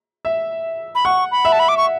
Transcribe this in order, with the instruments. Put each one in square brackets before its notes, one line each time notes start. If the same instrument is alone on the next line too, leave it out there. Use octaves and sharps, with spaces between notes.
[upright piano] E5
[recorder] B5
[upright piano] F#5 [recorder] C#6
[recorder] B5
[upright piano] E5
[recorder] A5
B5
D6
C#6